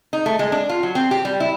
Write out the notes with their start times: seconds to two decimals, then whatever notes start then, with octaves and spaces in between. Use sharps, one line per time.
0.13 D#4
0.26 A3
0.39 G#3
0.52 D4
0.69 F4
0.83 F#3
0.95 C4
1.11 G4
1.25 G3
1.40 E4